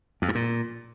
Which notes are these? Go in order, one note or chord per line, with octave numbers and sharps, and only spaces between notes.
F2
G2
A#2